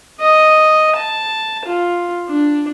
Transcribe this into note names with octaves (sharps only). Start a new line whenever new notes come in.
D#5
A5
F4
D4